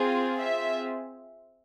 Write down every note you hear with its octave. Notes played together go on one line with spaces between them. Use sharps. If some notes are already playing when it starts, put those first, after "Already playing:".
Already playing: C4 F4 G#4
E5